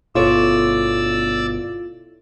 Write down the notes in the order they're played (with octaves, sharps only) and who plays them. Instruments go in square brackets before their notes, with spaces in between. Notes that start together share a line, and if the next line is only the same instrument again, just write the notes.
[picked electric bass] G1 B2 [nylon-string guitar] E4 A4 C#5 [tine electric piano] F4 [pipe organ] D5 E6